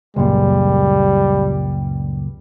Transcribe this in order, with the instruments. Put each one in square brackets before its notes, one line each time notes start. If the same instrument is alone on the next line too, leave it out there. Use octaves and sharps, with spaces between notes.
[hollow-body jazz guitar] C#2 F#2 A#2 [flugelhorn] G3